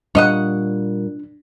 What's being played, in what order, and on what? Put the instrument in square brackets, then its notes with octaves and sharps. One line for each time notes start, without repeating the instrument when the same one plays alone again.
[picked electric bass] A#2 G3 [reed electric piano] D4 [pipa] C#5 D#5 F#5